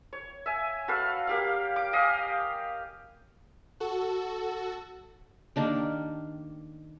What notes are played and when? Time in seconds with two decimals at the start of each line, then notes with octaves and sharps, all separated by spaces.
0.13 C#5
0.46 E5 G#5
0.88 F#4 A4 B4 F5
1.27 A#3 G4 F5
1.76 D6
1.93 G4 D#5 F5 G#5
3.80 F#4 A4
5.56 D#3 A#3 D4 G4